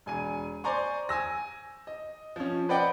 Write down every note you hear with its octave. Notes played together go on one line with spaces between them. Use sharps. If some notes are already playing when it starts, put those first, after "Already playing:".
E1 G#5 D#7
C5 D5 G#5 A#5 C6 C#6
G#5 E6 A#6
D#5
F3 C#4
B4 C5 D5 D#5 F#5 G5